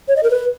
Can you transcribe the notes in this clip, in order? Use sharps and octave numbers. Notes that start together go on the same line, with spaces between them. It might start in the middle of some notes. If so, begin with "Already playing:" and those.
C#5
D#5
A#4
B4